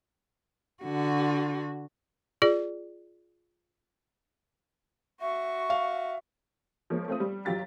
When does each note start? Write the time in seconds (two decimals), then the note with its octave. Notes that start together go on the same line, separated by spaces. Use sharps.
0.83 D3 F#4
2.42 F4 G#4 D5
5.21 F#4 E5 C#6
5.70 F5
6.90 F3 G#3 A#3 A#4 C#5
7.08 A3 C4 F4 D#6
7.20 G3
7.45 G1 F#3 F4 G4 A6 B6